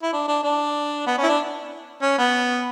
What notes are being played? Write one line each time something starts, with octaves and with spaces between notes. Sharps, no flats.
E4
D4
D4
D4
B3
C#4
E4
D4
C#4
B3